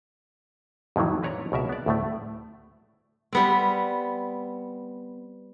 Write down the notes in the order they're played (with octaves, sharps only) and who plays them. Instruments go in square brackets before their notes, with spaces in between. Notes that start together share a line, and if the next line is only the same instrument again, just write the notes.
[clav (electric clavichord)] F2 A2 D#3 E3 F#3
C4 B4 C#5 D5 A#5
C#2 B2 A#4 E5
B3 D5
D2 A2 A3
[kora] G3 B3 C4